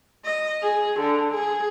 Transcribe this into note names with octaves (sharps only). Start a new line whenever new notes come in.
D#5
G#4
D3
G#4